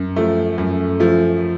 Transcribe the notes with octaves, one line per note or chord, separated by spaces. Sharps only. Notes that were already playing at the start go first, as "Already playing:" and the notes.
Already playing: F#2
F3 A3
F#2
F3 A3